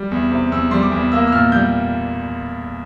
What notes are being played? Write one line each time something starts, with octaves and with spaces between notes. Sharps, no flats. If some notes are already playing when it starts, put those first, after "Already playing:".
Already playing: G3
E2
C3
E2 E6
G3 C6
D6
E2
A#3 E6
E6
A#2 F6
G3 G6